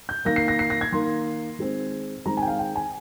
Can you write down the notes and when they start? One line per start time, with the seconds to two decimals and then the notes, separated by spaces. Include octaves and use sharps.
0.09 G6
0.25 D#3 A#3 A#6
0.36 C7
0.48 A#6
0.59 C7
0.70 A#6
0.81 G#6
0.92 D#3 A#3 C6
1.59 D#3 G#3 C4
2.26 D#3 G#3 C4 A#5
2.37 G#5
2.42 G5
2.48 F5
2.59 G5
2.76 G#5